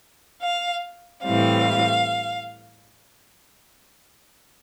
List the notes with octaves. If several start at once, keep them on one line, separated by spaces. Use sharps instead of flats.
F5
A2 E3 G3 C4 F5